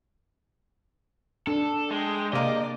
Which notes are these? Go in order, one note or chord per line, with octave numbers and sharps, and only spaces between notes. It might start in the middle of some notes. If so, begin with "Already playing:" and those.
D4 A4
G#3 G5
C3 A#3 D5 D#5